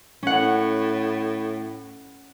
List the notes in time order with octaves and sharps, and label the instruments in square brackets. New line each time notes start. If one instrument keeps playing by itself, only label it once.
[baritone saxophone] A2 [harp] C#4 F#5